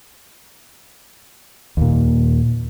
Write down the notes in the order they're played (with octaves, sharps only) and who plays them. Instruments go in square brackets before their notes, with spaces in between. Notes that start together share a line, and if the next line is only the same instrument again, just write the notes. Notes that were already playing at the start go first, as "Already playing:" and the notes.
[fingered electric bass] D#2 A#2